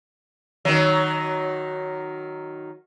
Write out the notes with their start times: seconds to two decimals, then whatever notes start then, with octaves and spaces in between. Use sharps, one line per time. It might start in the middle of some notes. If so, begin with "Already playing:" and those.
0.65 D#3 F#3